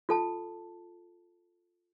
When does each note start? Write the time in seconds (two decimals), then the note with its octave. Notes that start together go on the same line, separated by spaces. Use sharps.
0.09 F4 A4 A5